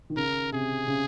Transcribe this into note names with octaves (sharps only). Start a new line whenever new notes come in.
D#3
C#3 A#4
C3 G#4
C#3